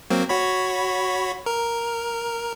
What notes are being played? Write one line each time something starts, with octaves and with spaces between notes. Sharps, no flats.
F#3 A#3 C4
F#4 C#5 B5
A#4